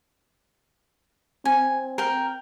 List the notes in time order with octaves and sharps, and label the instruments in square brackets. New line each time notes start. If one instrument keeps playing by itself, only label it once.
[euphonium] C4 [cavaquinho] G#5
[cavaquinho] A#4 G5